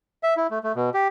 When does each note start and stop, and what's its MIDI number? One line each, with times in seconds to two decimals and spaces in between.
0.23 0.34 76
0.37 0.47 64
0.51 0.59 57
0.64 0.72 57
0.76 0.90 47
0.94 1.08 67